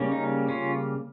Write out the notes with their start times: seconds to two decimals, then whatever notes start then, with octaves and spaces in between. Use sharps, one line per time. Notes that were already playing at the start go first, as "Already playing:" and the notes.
Already playing: C#3 G3 A#3 C#4
0.12 D#4
0.48 C#4 F4